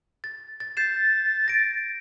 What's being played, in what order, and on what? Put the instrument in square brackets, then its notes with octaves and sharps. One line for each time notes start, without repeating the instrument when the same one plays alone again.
[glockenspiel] A6
A6
[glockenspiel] G6 C7 E7 [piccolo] A6
[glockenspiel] A#6 D7